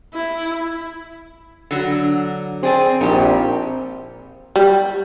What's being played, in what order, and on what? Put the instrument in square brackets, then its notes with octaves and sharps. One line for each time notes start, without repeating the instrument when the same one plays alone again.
[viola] E4
[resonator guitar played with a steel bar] D3 F#3
[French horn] C4 [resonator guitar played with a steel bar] G#4 D5 G#5
[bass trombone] A#1 [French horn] C4 [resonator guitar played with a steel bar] D#4 G4
[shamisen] G3